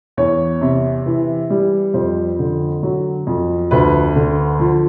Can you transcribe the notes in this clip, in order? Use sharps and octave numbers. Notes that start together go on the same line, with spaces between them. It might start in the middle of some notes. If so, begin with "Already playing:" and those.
E2 C#5
C3
E3
G3
F2 C5
D3
F#3
F2
D2 B4
D3
F3